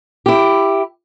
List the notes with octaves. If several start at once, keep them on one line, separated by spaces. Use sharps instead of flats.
E4 G4